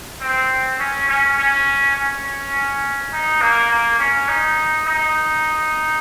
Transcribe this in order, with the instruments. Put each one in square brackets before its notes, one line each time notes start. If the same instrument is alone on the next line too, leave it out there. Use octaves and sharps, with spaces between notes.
[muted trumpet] C4
C#4
C#4
C#4
C#4
D#4
A#3
A#3
C#4
D#4
D#4